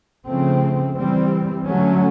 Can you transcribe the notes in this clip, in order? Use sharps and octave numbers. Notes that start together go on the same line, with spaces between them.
C#3 F3 A3 C4
E3 G3 C4
D3 F#3 A3 C#4